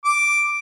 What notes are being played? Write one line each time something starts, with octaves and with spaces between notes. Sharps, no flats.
D6